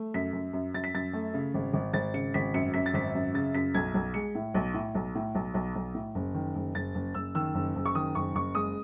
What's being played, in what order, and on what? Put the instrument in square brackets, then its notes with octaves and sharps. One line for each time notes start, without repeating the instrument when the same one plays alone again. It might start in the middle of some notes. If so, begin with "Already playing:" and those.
Already playing: [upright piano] A3
F#2 B6
F#2
F#2
F#2 A6
B6
F#2 A6
A3
C#3
G#1
G#1
G#1 A6
C#3 C#7
G#1 B6
F#2 C#7
F#2 B6
A6
G#1 B6
F#2
C#3 A6
F#2 B6
B1 G#6
B1
G#3 C#7
A2
B1
A2
B1
A2
B1
B1
B1
A2
F#1
D#3
F#1
F#1 A6
F#1
F#1 E6
D#3 E6
F#1
F#1
C#6
D#3 D#6
F#1 C#6
F#1 C#6
G#3 D#6